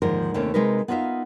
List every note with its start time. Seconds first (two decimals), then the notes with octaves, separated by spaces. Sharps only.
0.02 D#2 G#2 D3 F3 A#4
0.34 D#2 C3 A3 A#3 C4 C#4
0.54 C3 G#3 D#4 A#4 B4
0.88 B3 D#4 F4 D5 E5 F5